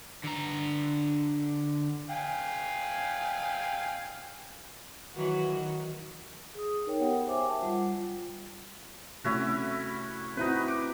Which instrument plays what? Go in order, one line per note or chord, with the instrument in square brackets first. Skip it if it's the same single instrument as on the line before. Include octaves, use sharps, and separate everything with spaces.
[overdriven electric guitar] D3 A#5
[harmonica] F5 G5 G#5
[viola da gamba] D#3 E3 F#3 [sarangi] F#4
[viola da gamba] D#3
[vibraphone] G#4 D#6
D#4 A#4 C#5 G5
B3 G4 A#4 F#5 G5
C5 E5 G5 G#5 D6
G5 A5
G3 F4 F#5
[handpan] C3 A3 [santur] C#4 E4 F#4
[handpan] C4 E4 F#4 [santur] D#4 B4
[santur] D6